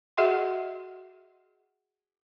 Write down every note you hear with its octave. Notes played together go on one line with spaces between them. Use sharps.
F#4 G#4 D#5 E5 F#5 C6